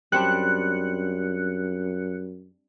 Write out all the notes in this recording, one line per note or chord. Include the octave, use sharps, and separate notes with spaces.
F#2 G3 C4 D4 F#6 C#7